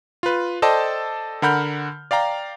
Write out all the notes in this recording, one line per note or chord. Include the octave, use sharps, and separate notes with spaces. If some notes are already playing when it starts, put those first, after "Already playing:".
F4 B4
A4 C5 D5 D#5 G5 A5
D3 A#4 F#5 B5 F6 G6
D5 F5 G5 A#5